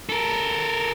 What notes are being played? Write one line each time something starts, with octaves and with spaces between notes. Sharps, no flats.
A4 A#4